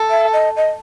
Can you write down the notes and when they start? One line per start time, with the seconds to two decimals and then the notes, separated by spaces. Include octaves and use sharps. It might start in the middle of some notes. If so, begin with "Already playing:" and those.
Already playing: A4
0.10 E5
0.33 D#5
0.56 D#5